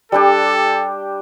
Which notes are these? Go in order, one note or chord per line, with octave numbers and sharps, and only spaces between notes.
G3 D4 G4 A4